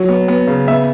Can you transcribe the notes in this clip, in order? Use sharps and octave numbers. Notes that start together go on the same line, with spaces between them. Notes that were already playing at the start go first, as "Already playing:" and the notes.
Already playing: F#3
B3
B3
C#3
B3 E5